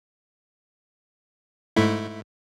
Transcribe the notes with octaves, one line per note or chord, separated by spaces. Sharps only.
G#2 A3 E4